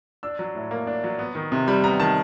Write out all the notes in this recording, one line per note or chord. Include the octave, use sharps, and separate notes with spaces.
D4 E6
F#3
A2
A#3
D4
F#3
B3
D#3
C3
G3 B5
B3 A#5
D#3 A5